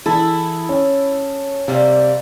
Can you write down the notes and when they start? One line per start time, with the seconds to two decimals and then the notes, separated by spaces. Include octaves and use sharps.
0.06 E3 E4 G#4 A4 A5
0.69 C#4
1.68 C3 G3 A#3